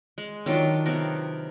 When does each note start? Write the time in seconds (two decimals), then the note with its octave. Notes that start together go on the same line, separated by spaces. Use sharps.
0.18 G#3
0.46 D#3 F#3 D4 F4
0.86 C3 F#3 B3 A#4